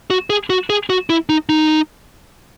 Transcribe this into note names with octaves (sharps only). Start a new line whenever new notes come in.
F#4
G#4
F#4
G#4
F#4
E4
D#4
D#4